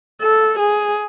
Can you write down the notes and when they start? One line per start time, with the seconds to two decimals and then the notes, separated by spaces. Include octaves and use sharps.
0.22 A4
0.59 G#4